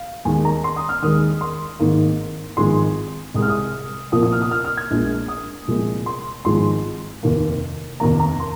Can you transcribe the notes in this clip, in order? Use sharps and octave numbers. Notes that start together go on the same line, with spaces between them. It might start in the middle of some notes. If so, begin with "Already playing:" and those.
Already playing: F5
D#2 D#3 G#3 G#5
A#5
C6
D#6
F6
D#2 D#3 G#3 D#6
C6
G#1 G#2 D#3 A#3
G#1 G#2 F3 G#3 C6
C2 C3 G#3 D#6
F6
D#6
C2 A#2 F3 A#3 D#6
D#6
F6
D#6
F6
F6
G#6
A#1 A#2 G#3
D#6
C2 A#2 F3 G#3
C6
G#1 G#2 F3 G#3 C6
F1 D#2 D#3 A#3
F1 D#2 D#3 A#3 A#5
A#5
C6